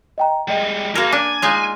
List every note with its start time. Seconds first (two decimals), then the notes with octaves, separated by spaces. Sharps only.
0.18 D#5 G5 A#5
0.48 G3 G#3 D#5 G5
0.95 A#3 F#4 G#4 A#4 A5 F6 A#6
1.12 D4 G#5 D6
1.42 G#3 D#4 F4